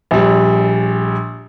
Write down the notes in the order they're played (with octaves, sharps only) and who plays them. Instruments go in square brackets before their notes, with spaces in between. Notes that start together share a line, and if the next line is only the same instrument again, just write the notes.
[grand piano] A#1 G3